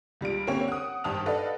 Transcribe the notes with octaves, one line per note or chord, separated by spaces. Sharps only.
C#2 G3 F4 D7
D3 A#3 C4 C#4 G4 C#5
F#5 D#6
G#1 G2 G4 A5 D#6 F7
A4 B4 D5 D#5 F5 F#5